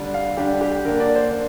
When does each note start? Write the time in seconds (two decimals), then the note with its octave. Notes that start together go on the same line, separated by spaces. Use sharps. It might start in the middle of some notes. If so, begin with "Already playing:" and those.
Already playing: D3 G3 D4
0.14 F5
0.37 D3 G3 D4 G4
0.61 G4
0.85 D3 A#3 D4 A#4
1.00 D5
1.16 C5
1.32 A#3 D4